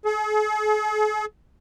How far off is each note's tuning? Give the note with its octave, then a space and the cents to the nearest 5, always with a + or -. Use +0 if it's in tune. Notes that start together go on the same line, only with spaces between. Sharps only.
G#4 +45